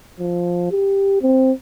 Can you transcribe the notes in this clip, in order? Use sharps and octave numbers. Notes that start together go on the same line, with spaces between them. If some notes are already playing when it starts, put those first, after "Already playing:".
F3
G4
C4